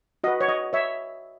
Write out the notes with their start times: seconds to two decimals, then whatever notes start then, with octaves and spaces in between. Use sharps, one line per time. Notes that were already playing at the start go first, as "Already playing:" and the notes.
0.24 F#4 B4 D#5
0.41 C#5
0.48 D#5
0.73 C#5 E5